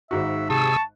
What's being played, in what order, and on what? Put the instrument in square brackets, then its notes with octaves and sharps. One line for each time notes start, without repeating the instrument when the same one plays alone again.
[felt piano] G#1 G#2 F#4 [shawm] E5
[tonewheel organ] C3 G#4 E6 [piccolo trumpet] A5 [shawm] C#6